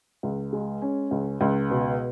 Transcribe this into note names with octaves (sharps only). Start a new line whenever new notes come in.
C#2
G#3
C#4
C#2
C#2
B2